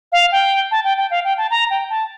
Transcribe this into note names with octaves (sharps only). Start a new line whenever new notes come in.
F5
G5
A5
G5
G5
F5
G5
A5
A#5
G5
A5